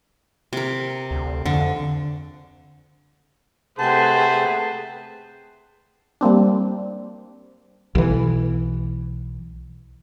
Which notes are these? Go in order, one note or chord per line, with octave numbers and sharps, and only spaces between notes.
C3 A#4
D2
F2 D3
C3 A3 G#4 B4 C5 F#5 G5 A5
G3 A#3 C4 D4
B1 E3